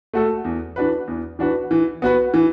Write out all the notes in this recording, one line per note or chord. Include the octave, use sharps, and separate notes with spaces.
A3 F#4 A4
E2
E3 D4 F#4 B4
E2
E3 D4 F#4 B4
E3
B3 F#4 B4
E3